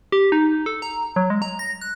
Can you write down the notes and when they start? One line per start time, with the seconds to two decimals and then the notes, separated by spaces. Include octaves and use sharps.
0.12 G4
0.32 D#4
0.66 A4
0.82 A#5
1.16 F#3
1.30 G#3
1.42 A#5
1.59 A#6
1.81 F#6